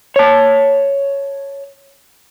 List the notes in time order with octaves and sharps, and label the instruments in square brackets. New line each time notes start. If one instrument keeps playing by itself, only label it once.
[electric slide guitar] C#5 A5